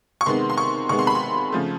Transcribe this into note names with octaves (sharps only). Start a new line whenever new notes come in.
C#6
C3 D#3 G#3 B3 C6
C6
C#6
C3 D#3 G#3 B3 C#6
C6
B5
C6
C#3 F3 A3